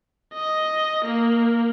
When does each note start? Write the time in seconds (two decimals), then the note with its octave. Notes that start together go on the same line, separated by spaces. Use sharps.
0.33 D#5
1.04 A#3